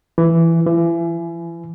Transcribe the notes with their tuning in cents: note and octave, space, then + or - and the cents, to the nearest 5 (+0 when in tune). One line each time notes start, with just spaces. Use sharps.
E3 +10
E3 +35